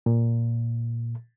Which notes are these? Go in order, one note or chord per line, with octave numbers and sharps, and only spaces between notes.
A#2